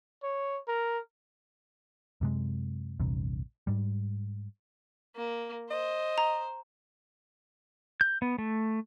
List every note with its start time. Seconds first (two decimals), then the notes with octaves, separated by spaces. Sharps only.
0.23 C#5
0.68 A#4
2.21 F#2 C3 G#3
2.99 A#1 E2 G2 C3
3.67 G#2 G3
5.16 A#3
5.70 C5 D#5
6.18 A#5
8.01 G6
8.22 B3
8.38 A3